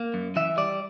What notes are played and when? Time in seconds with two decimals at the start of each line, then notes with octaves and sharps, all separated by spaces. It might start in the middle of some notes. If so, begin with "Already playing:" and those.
Already playing: A#3
0.14 F#2
0.36 E3 E5
0.57 G3 D5